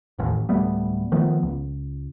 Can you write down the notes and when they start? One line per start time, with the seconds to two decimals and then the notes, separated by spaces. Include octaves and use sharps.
0.18 E1 A1 D#2
0.49 D1 G3 A3 B3
1.12 D#3 F3 A3 B3
1.43 C#2